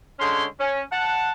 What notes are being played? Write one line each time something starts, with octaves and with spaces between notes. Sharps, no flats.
D3 G#3 C#4 C#5 C6
C#4
F#5 A5